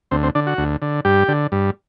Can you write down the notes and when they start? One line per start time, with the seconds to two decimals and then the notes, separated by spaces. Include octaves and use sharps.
0.11 D2 C4
0.23 C4
0.35 D3 D4
0.47 F#4
0.58 D2
0.82 D3
1.05 G2 G4
1.28 D3
1.52 G2